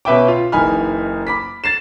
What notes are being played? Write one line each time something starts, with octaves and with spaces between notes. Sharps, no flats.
B2 C#4 B4 E5 G5 D6
F4
F#1 E3 D#4 G#5 B5 F6
B5 D6 B6
A6 C7 E7